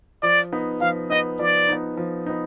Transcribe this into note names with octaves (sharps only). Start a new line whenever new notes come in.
F3 D5
B3 D#4
F3 F5
B3 D#4 D#5
F3 D5
B3 D#4
F3
B3 D#4